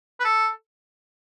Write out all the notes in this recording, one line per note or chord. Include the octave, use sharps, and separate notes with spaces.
B4
A4